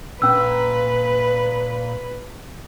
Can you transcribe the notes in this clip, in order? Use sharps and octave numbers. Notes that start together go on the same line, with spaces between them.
A#2 C#4 B4 E6